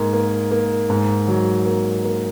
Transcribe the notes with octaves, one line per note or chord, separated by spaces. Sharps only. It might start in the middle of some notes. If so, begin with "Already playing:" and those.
Already playing: G#2 A#3
A#3
A#3
G#2
F#3
A#3
A#3